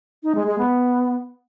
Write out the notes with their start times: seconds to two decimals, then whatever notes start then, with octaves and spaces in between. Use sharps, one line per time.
0.23 D#4
0.35 G#3
0.47 G#3
0.58 B3